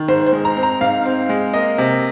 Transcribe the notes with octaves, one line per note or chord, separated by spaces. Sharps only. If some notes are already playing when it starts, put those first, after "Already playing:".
Already playing: D#3
G#2 C5
C5
G#3
A#5
C4
A#5
G#2 F5
C4
G#3
A#3 D#5
C3